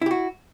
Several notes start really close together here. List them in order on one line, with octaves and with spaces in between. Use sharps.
E4 G4 F#4